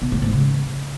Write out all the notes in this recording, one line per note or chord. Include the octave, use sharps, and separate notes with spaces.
B2
A2
G#2
C#3